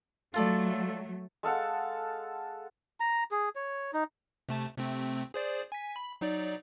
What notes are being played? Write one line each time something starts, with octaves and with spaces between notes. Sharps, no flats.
F#3 A3 F4 A4 D5
G#3 A4 F5 F#5
A#5
G#4
C#5
D#4
C3 A3 A5
C3 A3 C4
G#4 C5 D5
G#5 B6
B5
F#3 D#4 D5